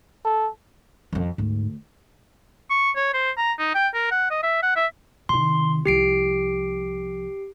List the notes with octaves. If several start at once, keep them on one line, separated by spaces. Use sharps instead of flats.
A4
F2 F3
D2 G#2
C#6
C#5
C5
A#5
D#4
G5
A#4
F#5
D#5
E5
F#5
E5
C3 D#3 C6
C2 F3 G4 C7 D7